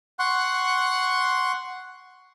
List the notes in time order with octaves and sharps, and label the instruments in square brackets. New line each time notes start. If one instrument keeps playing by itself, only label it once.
[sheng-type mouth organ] F#5 C6 C#6 F#6